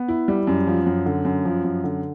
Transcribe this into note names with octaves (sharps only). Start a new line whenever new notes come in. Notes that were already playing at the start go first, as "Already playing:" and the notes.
Already playing: B3
E4
G3
F#2
F3
F#2
D3
F#2
F3
F#2
D3